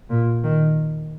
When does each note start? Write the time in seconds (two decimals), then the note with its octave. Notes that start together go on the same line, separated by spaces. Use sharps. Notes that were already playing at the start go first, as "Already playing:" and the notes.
0.10 A#2
0.43 D#3